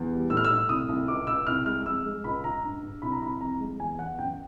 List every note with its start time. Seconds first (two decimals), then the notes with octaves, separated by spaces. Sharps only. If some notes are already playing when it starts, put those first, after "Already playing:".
Already playing: E2
0.11 G3
0.30 A2 E6
0.37 F6
0.44 E6
0.50 A2
0.69 C2 D#6
0.89 C2
1.08 C#2 D6
1.27 C#2 E6
1.47 C2 F6
1.66 G#3 F6
1.85 F2 E6
2.05 G#3
2.24 C#2 B5
2.44 C#2 A#5
2.63 G2
2.83 G2
3.02 C2 B5
3.12 A#5
3.21 C2 B5
3.41 F2 A#5
3.60 G#3
3.79 E2 G#5
3.99 E2 F#5
4.19 F#2 G5